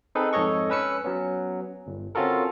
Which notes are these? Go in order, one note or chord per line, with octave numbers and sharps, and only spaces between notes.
C4 D#4 G#4 A4 B4
F2 G#2 A4 C#5 D#5 C#6
C#4 B4 E6 C#7
F#3 B3 C#4
G1
C4 C#4 F4 F#4 A4 A#4